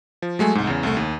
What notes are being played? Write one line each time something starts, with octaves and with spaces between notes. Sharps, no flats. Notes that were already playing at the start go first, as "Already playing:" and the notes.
F3
F#3 G#3 A3 G#5
C2 G#2
E2 C#3
C2 A3
D#2